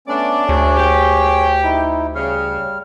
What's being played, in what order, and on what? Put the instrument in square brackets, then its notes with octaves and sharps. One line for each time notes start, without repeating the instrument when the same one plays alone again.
[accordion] A3 B3 C#4 [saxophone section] D4 D5
[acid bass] D2 [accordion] G#4 C#5
[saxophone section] G4
[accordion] D#4 E4
[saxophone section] C#3 [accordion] G3 F6